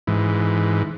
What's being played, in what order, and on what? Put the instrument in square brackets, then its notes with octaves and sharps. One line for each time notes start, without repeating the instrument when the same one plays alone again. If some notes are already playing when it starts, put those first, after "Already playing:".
[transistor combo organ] G#2 E3